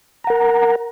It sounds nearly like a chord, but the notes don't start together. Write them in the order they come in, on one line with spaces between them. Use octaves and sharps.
A#5 F#5 A#4